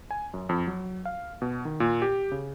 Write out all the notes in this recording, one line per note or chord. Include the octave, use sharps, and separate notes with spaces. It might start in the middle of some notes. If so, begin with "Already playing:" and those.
G#5
F#2
F2
F#3
F5
B2
D#3
A#2
G4
C#3